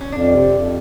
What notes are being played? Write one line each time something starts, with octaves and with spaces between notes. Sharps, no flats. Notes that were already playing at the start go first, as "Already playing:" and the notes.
C#4
F2 D4
C3
F2